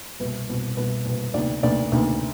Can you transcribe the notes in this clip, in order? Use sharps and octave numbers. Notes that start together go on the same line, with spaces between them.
C2 B2 B3 B4
C2 B2 B3
C2 B2 B3 B4
C2 B2 B3
D2 C3 D#3 B3 D5
D2 C3 D#3 B3 D5
D2 C3 D#3 B3